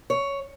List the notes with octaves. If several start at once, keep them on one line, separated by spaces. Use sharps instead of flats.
C#5